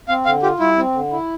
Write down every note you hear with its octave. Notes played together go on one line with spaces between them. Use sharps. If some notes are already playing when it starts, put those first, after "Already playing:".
C4 F5
D3 F5
F4 G4
G3 E4
C4
D3
E4